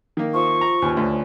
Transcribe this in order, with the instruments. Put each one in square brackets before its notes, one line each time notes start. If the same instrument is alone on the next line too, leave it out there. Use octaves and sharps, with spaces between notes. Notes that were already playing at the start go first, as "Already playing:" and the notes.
[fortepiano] D#3 A#3
[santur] F3 E5 D#6 [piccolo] C#6
[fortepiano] A#5
[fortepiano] D#2 [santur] C#4 B4 C#5
[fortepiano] D2